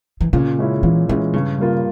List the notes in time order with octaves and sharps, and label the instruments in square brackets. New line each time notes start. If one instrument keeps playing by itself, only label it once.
[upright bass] E3
[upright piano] A#2 [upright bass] C#3
[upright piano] G#3 C#4 E4
[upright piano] A#2 [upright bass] E3
[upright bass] E3 [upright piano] G#3 C#4 E4
[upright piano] G2 [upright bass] C#3
[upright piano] G3 A#3 F4